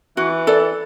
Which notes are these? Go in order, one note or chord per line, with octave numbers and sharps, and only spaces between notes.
E3 F#4
A4 D5